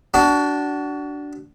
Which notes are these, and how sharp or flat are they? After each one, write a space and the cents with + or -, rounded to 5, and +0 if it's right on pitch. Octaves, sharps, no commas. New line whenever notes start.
D4 -10 F#4 +25